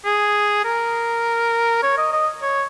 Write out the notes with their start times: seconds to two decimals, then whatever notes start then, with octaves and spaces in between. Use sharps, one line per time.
0.05 G#4
0.64 A#4
1.83 C#5
1.98 D#5
2.12 D#5
2.42 C#5